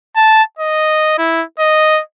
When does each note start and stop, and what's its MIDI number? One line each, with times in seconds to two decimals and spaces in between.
0.16 0.42 81
0.59 1.18 75
1.18 1.43 64
1.59 2.01 75